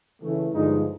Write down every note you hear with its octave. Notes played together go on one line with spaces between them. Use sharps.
C#3 E3 A3
G2 D3 F3 G#3 D#4